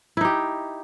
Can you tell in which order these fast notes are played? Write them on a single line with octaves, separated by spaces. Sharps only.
E4 D#4 G4